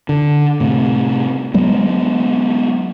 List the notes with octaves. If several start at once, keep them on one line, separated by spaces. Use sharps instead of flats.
D3
A2 C3
F#3 G#3 B3